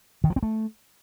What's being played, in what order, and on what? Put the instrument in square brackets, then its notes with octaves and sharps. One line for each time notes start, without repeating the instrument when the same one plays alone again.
[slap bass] D#3
F3
C4
A3